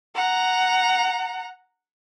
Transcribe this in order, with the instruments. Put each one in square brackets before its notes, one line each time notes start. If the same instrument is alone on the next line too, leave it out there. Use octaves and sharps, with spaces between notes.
[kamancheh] F#5 A#5